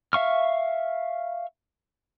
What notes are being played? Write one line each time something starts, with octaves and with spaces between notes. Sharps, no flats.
E5 F5 C#6 F6